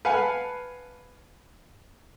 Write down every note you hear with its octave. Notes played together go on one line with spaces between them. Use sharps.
B4 F5 F#5 G#5 A5